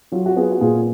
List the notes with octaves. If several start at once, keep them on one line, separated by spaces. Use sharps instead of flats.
F#3 F4
F#4
B3 F4 G#4
F#4
A#2 F4 G#4